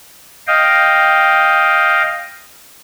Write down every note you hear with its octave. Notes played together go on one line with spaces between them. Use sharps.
D#5 F5 G5